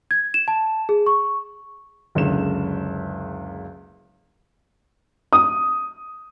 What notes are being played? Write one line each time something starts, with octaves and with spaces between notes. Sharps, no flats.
G#6
E7
A5
G#4
C#6
F#1 C#2 D3 E7
D#6